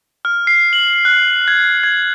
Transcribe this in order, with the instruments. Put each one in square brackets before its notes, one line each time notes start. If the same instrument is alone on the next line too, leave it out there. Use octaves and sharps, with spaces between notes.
[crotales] F6
C7
F#7
F#6
G#6
G#6